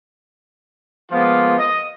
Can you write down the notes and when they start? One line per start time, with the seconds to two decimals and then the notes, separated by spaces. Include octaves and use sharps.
1.11 F3 G#3 A#3 B3 F4
1.58 D#5